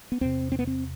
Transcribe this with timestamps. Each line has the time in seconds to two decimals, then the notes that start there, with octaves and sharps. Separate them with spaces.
0.12 B3
0.21 E2 C3 C4
0.52 C4
0.59 B3
0.67 C4